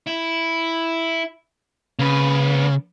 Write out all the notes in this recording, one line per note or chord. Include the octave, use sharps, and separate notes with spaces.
E4
C#3 A#3 B4